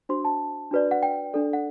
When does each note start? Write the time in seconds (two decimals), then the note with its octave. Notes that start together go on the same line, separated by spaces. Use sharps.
0.09 D4 F#4 C5 C6
0.25 A5
0.71 D4 F#4 B4 D5
0.91 F#5
1.03 G5
1.33 D4 A4 D5
1.53 F#5